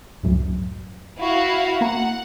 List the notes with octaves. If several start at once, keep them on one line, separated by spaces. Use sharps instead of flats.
C#2 F#2 A2
E4 F#4 F5
A#3 F#5 A#5